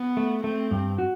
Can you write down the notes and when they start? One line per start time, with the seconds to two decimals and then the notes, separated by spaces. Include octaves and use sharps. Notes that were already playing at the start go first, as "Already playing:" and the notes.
Already playing: B3
0.17 A3
0.44 A3 C4
0.71 G2
0.98 F#4